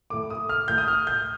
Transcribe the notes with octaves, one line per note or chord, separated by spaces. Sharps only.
A2 A3 D6
D#6
F6
A2 A3 G6
D#6
F6
G6